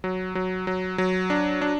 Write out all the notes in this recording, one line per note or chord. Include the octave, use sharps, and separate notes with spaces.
F#3
F#3
F#3
F#3
D4
D4